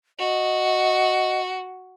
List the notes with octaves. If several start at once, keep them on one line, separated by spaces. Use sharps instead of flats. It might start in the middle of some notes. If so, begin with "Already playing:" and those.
F#4 D#5